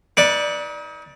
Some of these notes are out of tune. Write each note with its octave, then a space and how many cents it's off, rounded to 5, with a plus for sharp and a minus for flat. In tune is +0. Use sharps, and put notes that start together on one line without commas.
D#4 +40 B4 -10 D5 +5